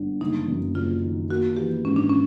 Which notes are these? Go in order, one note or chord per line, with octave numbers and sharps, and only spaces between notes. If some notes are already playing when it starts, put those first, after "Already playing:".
Already playing: G1 D3
F#1 D#4
F#2
F#1 F4
D#3
A#3 F#4
E3 G4
G#2 C#4
D4
C#4